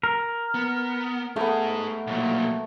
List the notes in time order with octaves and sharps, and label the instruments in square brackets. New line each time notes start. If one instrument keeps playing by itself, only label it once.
[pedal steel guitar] A#4
[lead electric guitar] B3
[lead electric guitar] G#2 G#4 [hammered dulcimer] A3 B3
[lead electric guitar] B1 A#2